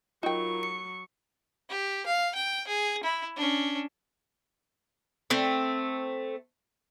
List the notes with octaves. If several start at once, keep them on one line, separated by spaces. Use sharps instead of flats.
F#3 D#4 F4 A#4 G5 C#6
C#7
G4
F5
G5
G#4
E4
C#4 D4
A3 C4